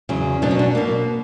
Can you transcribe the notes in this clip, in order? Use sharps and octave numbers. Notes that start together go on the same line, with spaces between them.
E2 C#3 F#3
B2 F#3 B3 D4
C#4
D4
B2 A#3